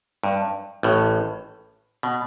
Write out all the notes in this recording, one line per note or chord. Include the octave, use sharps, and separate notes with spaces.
G2
A1 A2
B2